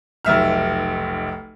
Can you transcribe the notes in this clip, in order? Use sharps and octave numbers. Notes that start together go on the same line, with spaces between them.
F1 B1 E5 F6